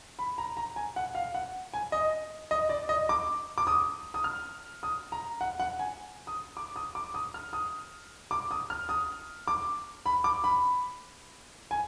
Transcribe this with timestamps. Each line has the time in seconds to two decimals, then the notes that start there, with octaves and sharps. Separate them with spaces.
0.19 B5
0.38 A#5
0.57 A#5
0.76 G#5
0.96 F#5
1.15 F5
1.35 F#5
1.74 G#5
1.92 D#5
2.51 D#5
2.69 D5
2.89 D#5
3.09 D6
3.58 D6
3.67 D#6
4.14 D#6
4.24 F6
4.83 D#6
5.12 A#5
5.41 F#5
5.60 F#5
5.79 G#5
6.27 D#6
6.57 D6
6.76 D#6
6.95 D6
7.14 D#6
7.34 F6
7.53 D#6
8.31 D6
8.51 D#6
8.70 F6
8.89 D#6
9.47 D6
10.06 B5
10.24 D6
10.44 B5
11.71 G#5